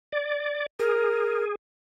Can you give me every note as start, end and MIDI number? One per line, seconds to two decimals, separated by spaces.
0.12 0.66 74
0.79 1.55 68
0.79 1.44 70